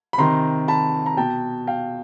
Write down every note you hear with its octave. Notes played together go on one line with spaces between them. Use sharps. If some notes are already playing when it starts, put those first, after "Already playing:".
B5
C3 D#3 A#5 C6
A5 B5
A#5
B2 G5 A5
F5 G5